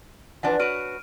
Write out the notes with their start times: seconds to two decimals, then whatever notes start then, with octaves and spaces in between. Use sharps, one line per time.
0.43 E3 F3 D4 B4 F#5
0.60 F#4 B4 C#5 F6 D7 D#7